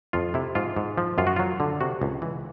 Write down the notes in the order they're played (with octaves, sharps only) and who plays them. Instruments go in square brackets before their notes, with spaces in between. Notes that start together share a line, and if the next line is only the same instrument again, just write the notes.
[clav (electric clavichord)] F2 F4
C3 E4
G#2 F4
G#2
F3
F#2 F4
F#4
F#3 F4
D3
C3 F#4
C#2
E3